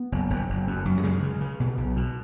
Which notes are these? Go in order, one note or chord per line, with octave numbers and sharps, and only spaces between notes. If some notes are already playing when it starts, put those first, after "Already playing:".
Already playing: B3
F#1
F#1
F#1
F#2
F#2
F#3
C#3 G#3
C#3
C#3
B2
B1
B2